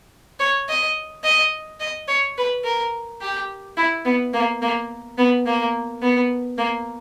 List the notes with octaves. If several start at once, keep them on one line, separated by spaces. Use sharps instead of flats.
C#5
D#5
D#5
D#5
C#5
B4
A#4
G4
E4
B3
A#3
A#3
B3
A#3
B3
A#3